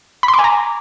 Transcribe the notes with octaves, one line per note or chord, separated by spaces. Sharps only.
B5
C6
D6
G#5
A#5